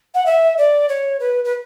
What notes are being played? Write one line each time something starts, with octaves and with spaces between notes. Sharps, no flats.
F#5
E5
D5
C#5
B4
B4